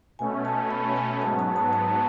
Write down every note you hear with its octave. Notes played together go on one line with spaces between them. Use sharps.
B2 A3 C#4 G#5
A5
B5
G#5
G#2 F#3 B3 A5
A5
A5
A5